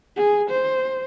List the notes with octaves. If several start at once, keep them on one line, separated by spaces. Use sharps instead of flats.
G#4
C5